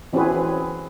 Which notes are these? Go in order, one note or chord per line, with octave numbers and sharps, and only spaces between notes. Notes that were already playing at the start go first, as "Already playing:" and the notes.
E3 C4 C#4 F#4 G#4 B4